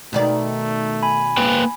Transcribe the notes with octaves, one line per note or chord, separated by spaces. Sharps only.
B2 D#3 A3 D5
G#5 B5
A#3 B4 G5